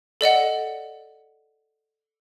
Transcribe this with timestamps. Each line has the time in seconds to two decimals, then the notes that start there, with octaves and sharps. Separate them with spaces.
0.21 A4 D5 D#5 F#5